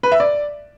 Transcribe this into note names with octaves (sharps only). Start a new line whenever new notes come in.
B4
E5
D5